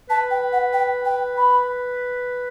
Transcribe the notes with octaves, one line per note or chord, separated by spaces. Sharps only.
B4 A5
G5
F#5
G5
G5
B5